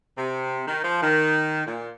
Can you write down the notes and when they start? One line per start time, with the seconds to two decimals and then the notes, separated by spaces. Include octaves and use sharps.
0.18 C3
0.67 D#3
0.84 F3
1.01 D#3
1.67 A#2